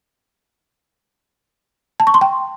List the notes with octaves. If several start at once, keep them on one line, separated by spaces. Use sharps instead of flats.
A5
C#6
C6
G5